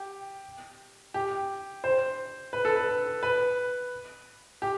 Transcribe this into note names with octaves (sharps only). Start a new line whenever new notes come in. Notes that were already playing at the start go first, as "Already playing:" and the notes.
Already playing: G4
G4
C5
B4
A4
B4
B4
G4